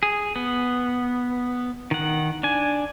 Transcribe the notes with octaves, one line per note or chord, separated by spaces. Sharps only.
G#4
B3
D#3 F#5
D4 G#5